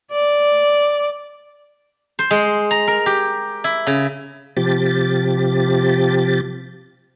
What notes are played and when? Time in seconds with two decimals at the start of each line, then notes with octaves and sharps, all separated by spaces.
0.13 D5
2.19 C5
2.31 G#3
2.71 A#5
2.87 A#4
3.06 G4
3.64 E4
3.87 C#3
4.57 C3 F3 G4 A6